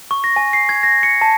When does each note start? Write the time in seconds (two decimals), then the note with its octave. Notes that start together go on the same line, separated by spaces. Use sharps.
0.11 C#6
0.24 A#6
0.36 G#5
0.53 C7
0.69 G#6
0.83 A#6
1.03 C#7
1.21 A5